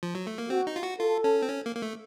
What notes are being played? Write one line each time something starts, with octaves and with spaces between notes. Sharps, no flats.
F3
F#3
A3
A#3
C4 F#4
D#4
F4
F#4
F4 A4
C#4
C4
C#4
A#3
A#3
A3